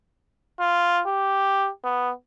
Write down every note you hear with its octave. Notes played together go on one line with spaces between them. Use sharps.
F4
G4
B3